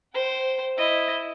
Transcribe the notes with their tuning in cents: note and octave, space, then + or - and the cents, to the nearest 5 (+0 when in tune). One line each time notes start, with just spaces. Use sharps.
C5 +0 G5 -20
E4 +0 D#5 +0